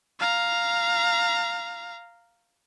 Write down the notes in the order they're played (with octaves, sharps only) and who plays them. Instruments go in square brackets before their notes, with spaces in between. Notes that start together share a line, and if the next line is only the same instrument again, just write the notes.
[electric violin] F5 A#5